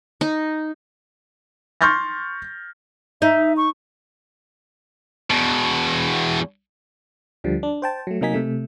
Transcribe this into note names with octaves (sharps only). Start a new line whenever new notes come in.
D#4
C6 C#6 F6 G6 A6 A#6
D#4 E5
C#6
E2 B2
D2 D3 F3 G3
D4
C5 G5 A5
F#3 A3
C3 F#3 A#3 D#4 G#5 B6
C3 A3